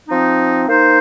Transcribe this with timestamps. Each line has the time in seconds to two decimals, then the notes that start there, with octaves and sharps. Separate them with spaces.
0.09 F3 C4 D#4
0.67 A#3 D#4 C5